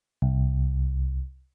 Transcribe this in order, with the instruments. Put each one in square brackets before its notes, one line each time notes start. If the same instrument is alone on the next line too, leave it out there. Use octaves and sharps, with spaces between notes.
[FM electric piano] C2